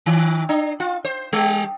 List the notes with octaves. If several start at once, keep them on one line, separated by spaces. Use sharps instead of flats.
D#3
D4
F4
C5
G3